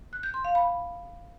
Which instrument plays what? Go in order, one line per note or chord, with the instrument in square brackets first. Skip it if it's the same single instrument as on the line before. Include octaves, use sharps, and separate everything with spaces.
[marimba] F#6
G6
C6
F5
B5